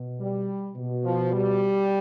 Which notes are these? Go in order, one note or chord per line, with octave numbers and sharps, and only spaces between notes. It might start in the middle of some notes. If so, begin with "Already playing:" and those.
Already playing: B2
G3
B2
F3
G3